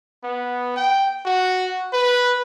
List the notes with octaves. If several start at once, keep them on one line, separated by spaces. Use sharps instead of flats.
B3
G5
F#4
B4